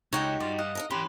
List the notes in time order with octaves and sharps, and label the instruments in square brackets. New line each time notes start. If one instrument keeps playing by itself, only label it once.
[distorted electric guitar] C#2 [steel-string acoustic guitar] D#4 F#4 G4 [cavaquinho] C#5 F#5 G5
[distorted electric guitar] G2 [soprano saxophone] F4 [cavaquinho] D5
[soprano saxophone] D#5 [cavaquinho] F5 F#5
[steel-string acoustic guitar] D#4 A4 A#4
[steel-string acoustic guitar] F#2 [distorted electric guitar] E3 G4 [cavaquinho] B4 [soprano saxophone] C6